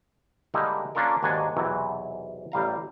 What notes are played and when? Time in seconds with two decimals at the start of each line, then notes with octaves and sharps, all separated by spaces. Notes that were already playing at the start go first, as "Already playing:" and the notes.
0.54 D3 G3 G#3 A#3 D#4 E4
0.95 A#3 C#4 D4 F4 A4 A#4
1.23 D#2 G#2 D4 F#4 G#5 A5
1.57 B1 E2 C3 E3 F#3
2.52 A1 G3 F5 A#5